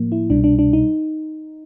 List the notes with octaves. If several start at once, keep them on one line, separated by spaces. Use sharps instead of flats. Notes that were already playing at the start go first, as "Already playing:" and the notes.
Already playing: A2 F3 A#3
E4
C2 B2 G3 D4
D4
D4
D#4